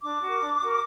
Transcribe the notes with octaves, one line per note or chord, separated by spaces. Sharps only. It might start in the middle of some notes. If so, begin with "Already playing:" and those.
D4 D6
F#4
A#4
D4
F#4 A#4